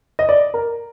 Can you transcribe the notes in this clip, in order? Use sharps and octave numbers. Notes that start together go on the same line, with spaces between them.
D#5
D5
A#4